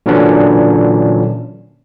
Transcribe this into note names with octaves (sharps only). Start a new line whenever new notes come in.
A#2 D3 E3 F#3 C#4 D4